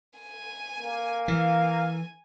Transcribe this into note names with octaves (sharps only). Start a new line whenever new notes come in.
G#5
A#3
E3 F5 G#5